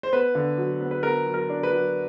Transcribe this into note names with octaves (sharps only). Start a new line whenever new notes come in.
C5
B3 B4
D3
F#3
B3
B4
B3 A#4
F#3
A#4
D4
B4
F#3